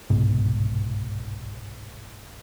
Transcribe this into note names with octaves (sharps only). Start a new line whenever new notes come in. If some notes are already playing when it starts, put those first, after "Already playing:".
G1 C2 G#2 B2